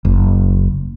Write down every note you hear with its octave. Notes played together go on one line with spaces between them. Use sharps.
F#1